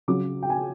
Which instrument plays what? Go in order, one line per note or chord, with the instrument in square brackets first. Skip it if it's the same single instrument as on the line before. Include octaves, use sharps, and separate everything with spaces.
[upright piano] C#3 F#3 D6
G5
G#5